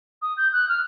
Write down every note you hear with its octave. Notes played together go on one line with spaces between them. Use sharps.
D#6
G6
F#6
F6